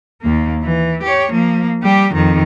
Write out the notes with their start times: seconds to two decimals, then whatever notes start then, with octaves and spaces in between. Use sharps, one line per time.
0.21 D#2 A#3
0.63 E3
1.03 G4 C#5
1.31 F3 A#3
1.82 G3 G4
2.13 F2 D#3